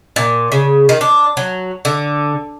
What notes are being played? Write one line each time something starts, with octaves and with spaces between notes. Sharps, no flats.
A#2
C#3
D#3
D4
F#3
D3